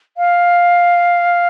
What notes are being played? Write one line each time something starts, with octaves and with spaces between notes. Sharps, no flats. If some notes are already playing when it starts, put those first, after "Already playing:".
F5